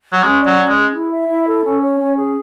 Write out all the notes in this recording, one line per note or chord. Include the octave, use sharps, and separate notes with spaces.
F#3
G#3 C#4
D5
F#3
C#4
G#3
G#4
E4
E5
E4
A4
C#4
C#5
C#4
G#4